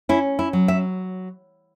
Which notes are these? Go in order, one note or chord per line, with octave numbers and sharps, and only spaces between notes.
C#4 E4
E4
F#3
E5